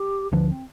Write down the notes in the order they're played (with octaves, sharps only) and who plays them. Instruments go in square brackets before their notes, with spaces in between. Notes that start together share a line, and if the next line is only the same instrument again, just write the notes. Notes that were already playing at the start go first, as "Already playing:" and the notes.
Already playing: [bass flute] G4
[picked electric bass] D2 D3 F3 [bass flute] B4
[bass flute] C4